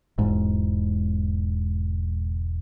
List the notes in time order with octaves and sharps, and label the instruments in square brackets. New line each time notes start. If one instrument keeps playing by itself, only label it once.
[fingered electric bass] E1 G#2